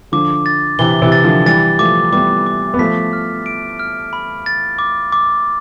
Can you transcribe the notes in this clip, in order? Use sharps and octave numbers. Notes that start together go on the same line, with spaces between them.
D3 F3 D6
A6
C3 E3 G7
C3 E3
A6
D3 F3
E3 G3 A6
F3 A3 D6
G3 B3 D6
D6
B3
F3 A3 B6
F6
D7
F6
B5
A6
D6
D6